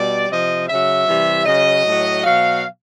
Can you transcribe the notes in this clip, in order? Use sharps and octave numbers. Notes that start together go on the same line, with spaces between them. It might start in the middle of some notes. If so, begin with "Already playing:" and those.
Already playing: B2 G3 D5
C3 F3 D#5
C#3 F#3 E5
C3 E3 G3
C#3 F#3 D#5
A2 F#3
B2 F#3 F5